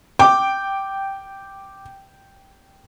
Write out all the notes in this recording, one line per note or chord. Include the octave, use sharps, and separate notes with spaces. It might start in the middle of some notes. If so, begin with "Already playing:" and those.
G5 D6